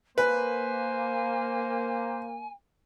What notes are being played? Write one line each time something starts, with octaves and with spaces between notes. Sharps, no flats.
A#3 B4 C5 G#5